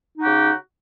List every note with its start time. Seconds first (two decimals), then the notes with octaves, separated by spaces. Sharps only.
0.17 D#4
0.20 F#4
0.22 G4
0.25 C#3